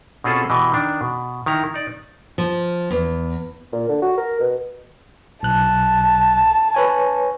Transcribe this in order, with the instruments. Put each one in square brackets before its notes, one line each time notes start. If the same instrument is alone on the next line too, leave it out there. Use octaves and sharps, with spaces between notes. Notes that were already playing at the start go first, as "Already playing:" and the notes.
[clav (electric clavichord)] B2 C4 C#4 F4 G#4 A4
B2 E3 G4 D#5
D#3 D4
B2
D#3 E4 A#5
D#4 D5
[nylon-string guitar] F3
E2
[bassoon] A#2
D3
F#4
A#4
B2
[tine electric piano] B1 F#6 [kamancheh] A5
[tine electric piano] B4 C#5 G#5